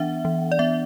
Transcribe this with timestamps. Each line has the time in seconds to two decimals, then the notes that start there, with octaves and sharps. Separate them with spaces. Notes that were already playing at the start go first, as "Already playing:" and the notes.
Already playing: E3 B3 D4 E5 F#5
0.25 E3
0.52 D5
0.59 B3 E5